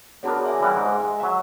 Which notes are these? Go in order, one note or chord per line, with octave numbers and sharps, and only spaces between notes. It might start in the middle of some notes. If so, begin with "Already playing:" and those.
B3 D4 F#4 G#4 A#4 C#5
E5 G#5
E3 G3 F#5
G#2
G#3
F#3 E5